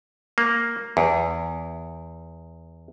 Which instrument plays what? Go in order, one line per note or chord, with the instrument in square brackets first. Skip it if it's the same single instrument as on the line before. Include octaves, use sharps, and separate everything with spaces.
[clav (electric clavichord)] A#3
E2